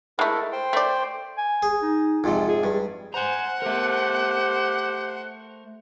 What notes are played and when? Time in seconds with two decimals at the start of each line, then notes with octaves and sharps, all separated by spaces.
0.19 G#3 A3 E4 A4 A#4
0.53 C5 G5 C6
0.73 A3 D5
1.38 G#5
1.63 G#4
1.82 D#4
2.24 F2 G#2 C3 F4
2.49 G#4
2.64 G2
3.14 C5 F#5 G#5 A#5
3.62 A3 G4 A#4 C5